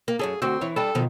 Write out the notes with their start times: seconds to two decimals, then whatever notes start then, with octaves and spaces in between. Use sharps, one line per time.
0.08 A#3
0.19 F#2 C#4 G#4 A4
0.42 D2 C4 F#4
0.61 E3 E4 C#5
0.76 G3 D4 A4
0.95 B2 D#3 F3